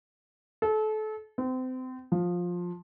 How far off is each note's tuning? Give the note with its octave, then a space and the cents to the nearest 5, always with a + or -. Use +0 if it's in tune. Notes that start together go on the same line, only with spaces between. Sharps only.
A4 -30
C4 -30
F3 +15